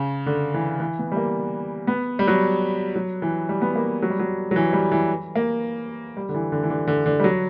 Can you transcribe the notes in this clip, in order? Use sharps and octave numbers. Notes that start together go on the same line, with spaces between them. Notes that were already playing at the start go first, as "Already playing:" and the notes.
Already playing: C#3
D3
E3
E3
B3
G3
A#3
B3
G3
F#3
F#3
E3
G3
B3
A#3
F#3
G3
F#3
F#3
E3
G3
E3
A#3
G3
D3
E3
D3
E3
D3
D3
D3
G3
F#3